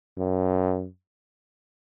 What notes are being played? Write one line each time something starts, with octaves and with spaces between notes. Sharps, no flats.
F#2